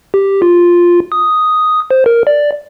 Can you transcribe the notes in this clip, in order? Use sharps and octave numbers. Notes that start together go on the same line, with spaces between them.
G4
F4
D#6
C5
A#4
D5